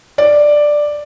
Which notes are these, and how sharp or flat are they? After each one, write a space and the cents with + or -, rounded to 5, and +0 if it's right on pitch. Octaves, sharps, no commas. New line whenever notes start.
D5 +5